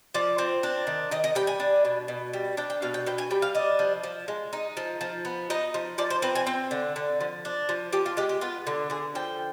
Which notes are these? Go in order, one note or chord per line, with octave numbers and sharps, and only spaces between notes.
F3 D5
C4
D4
D#3
D#3 D#5
D#5
G3 G5
G#5
D4
B2
B2
G3
D4 G5
G5
B2 F5
G5
B2 G5
G#5
G3 G5
F5
D4 D#5
F3
F3
G#3
D#4
F3
F3
B3
D#4 D#5
F3
F3 D5
C5
C4 B4
G#5
C4 G5
D3
D3
F3
D4
F3
F3 G4
F4
G#3 G4
G4
B3 F4
D3
D3 G#4
F3 G5